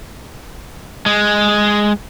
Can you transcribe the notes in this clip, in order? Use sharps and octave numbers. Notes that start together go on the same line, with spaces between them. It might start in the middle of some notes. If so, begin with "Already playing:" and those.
G#3